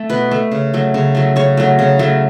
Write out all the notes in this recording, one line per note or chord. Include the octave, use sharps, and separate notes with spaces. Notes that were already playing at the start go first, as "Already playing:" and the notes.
Already playing: A3 A4
B2 B4
A3
C#3
F#3 A3
C#3
F#3 A3
C#3 C#5
F#3 A3
C#3
F#3 A3